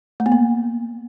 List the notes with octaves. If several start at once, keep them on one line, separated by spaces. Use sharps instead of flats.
A3
B3
A#3